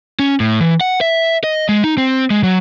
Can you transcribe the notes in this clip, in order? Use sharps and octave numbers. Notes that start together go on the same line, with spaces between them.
C#4
A2
E3
F#5
E5
D#5
G#3
D#4
C4
G#3
F#3